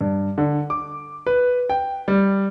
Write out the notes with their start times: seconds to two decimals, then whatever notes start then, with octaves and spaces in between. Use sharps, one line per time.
0.01 G2
0.38 D3
0.70 D6
1.27 B4
1.70 G5
2.08 G3